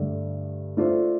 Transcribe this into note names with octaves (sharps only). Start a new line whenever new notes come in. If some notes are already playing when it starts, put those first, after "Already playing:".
Already playing: G2 D3 A3 D4
A3 D4 F4 C5